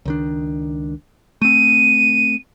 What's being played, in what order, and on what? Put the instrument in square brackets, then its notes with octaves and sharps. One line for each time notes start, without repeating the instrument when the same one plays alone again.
[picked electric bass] C#2 D#3 D4
[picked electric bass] A3 C4 [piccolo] D#7